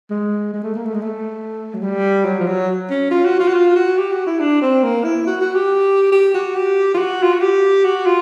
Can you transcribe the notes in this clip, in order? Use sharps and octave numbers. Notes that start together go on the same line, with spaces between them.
G#3
G#3
A3
A#3
A3
G#3
A3
F#3
G3
F#3
F3
F#3
C#4
F4
F#4
F4
F#4
F4
F#4
G4
F#4
E4
D4
C4
A#3
E4
F#4
F#4
G4
G4
F#4
G4
F4
F#4
F4
F#4
G4
F#4
F4